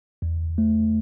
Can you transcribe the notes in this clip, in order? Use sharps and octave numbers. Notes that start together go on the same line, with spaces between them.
E2
A3